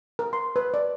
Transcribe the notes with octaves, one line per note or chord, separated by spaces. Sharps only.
A#4
C6
B4
D5